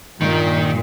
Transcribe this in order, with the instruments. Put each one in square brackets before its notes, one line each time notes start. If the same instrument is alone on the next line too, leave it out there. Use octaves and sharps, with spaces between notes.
[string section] G2 A#2 [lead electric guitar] D#3